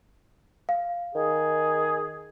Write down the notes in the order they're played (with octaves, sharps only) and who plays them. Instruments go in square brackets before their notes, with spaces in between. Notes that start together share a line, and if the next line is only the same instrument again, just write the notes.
[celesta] F5
[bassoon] D#3 [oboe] G#4